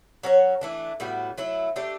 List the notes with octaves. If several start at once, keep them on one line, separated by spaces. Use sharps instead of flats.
F#3 C#4 F#4 C#5
E3 A3 D4
A2 G3 B3 F#4
F#3 A3 E4
A3 D4 G4